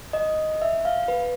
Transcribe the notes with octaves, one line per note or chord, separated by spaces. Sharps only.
D#5
E5
F5
B4